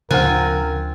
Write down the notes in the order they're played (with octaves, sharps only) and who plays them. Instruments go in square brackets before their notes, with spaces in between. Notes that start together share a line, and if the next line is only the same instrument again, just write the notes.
[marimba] D2 F#6 [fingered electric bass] C#3 F3 [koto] C4 F4 G#5 [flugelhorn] A#4